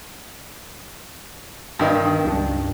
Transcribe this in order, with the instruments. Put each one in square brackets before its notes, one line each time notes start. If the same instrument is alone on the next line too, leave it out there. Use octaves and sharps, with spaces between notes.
[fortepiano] G2 D#3 D#4
D#3
[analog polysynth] C#2 G2 D4